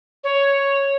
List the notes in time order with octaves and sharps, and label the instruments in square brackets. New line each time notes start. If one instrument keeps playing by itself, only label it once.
[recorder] C#5